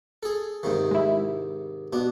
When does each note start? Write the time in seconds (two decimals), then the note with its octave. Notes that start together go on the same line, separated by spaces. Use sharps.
0.23 G#4 A4
0.63 G#2 C3 D#3
0.91 G#3 E4
1.93 B2 D4